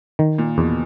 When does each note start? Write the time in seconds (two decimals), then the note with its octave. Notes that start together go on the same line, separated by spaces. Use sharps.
0.19 D#3
0.38 A#2
0.58 E2 B2